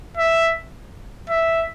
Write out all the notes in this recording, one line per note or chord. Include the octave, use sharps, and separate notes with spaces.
E5
E5